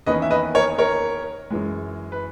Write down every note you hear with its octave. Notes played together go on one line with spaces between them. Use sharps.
E2 D#3 A#3 C#4 B4 D#5
E5
B4 D#5
A#4 C#5
A#4 C#5
F#2 E3 G#3
B4